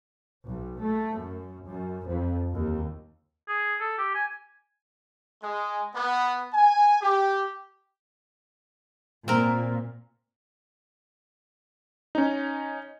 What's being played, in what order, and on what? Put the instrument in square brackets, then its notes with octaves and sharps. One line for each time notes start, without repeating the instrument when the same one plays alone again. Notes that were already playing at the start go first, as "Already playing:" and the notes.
[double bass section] B1
A3
F#2
F#2
F2
D#2
[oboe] G#4
A4
G4
G#5
[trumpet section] G#3
B3
G#5
G4
[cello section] A#2 [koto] C4 A#4
[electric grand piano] C#4 D#4